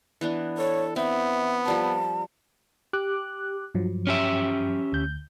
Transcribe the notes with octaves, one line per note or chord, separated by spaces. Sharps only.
E3 B3 D4
A4 C#5
B3 C4 E5
F3 G3 A#4 A5
G4 D6 F#6
G2 F3 F#3
C#4 G4 E5
D2 G6